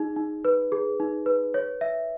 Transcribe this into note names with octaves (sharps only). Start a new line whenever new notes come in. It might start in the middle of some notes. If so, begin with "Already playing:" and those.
Already playing: D#4 G#4
D#4
B4
G#4
D#4
B4
C#5
E5